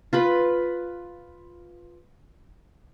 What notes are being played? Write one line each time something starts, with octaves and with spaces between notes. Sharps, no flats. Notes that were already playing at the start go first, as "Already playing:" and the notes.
F4 B4 B5